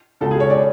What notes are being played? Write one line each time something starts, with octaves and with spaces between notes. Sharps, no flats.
C#2 B2 A4
G#4
C#5
D5